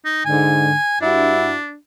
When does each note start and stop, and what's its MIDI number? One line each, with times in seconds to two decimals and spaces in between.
0.05 0.25 63
0.25 0.74 44
0.25 0.74 50
0.25 0.98 80
1.01 1.55 43
1.01 1.76 62
1.01 1.55 64
1.01 1.55 66